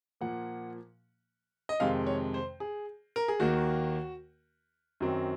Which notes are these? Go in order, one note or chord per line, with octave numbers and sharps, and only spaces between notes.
A#2 F3 A#3 F#5
D#5
F2 C3 D#3 G#3 F5
C#5
C5
G#4
A#4
G#4
D#2 D#3 A#3 F#4
F#2 D#3 F#3 C4